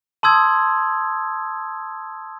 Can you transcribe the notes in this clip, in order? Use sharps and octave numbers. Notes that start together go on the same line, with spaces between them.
A5 C6 D#6 E6 G#6